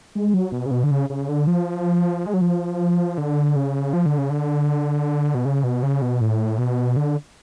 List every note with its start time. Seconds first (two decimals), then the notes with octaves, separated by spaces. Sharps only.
0.15 G#3
0.34 F#3
0.52 B2
0.66 C#3
0.71 B2
0.84 D3
0.91 C#3
1.10 C#3
1.29 D3
1.47 F3
2.26 G#3
2.34 F#3
2.41 F3
3.18 D3
3.56 C#3
3.93 F3
4.06 D3
4.18 C#3
4.30 D3
5.35 B2
5.45 C#3
5.64 B2
5.83 C#3
6.02 B2
6.21 A2
6.58 B2
6.97 D3